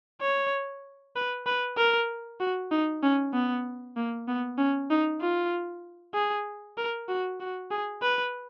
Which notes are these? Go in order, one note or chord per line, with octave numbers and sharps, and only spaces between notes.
C#5
B4
B4
A#4
F#4
D#4
C#4
B3
A#3
B3
C#4
D#4
F4
G#4
A#4
F#4
F#4
G#4
B4